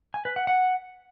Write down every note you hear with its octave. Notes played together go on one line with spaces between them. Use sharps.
G#5
B4
F#5
F#5